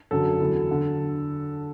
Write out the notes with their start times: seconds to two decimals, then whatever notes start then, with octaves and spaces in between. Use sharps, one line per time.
0.11 F#2 D3 F#3 A4
0.40 E2 D3 F#3
0.71 D3